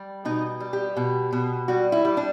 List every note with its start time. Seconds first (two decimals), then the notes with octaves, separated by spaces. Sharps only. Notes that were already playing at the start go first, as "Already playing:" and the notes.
Already playing: G3
0.25 B2 D#4
0.60 G3
0.73 G4
0.97 B2
1.33 B2
1.68 G3 F#4
1.92 E4
2.05 G3
2.17 D4